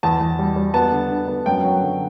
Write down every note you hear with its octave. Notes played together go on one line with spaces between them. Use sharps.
E2 A5
E2
G3
G3
B3 A5
D3
D3
B3
F#2 G5
F#3
D3